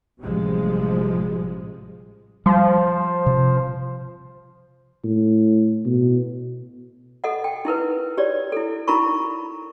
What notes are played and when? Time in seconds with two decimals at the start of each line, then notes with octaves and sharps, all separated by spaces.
0.22 A1 C3 F3 G3 G#3
2.46 F3 G3
3.26 C3
5.04 A2
5.85 B2
7.24 A4 D#5 F#5
7.44 G5
7.65 D#4 E4 A#4 B4
8.18 G4 C#5 D5
8.52 E4 A4
8.88 D#4 E4 A#4 A#5 B5 C#6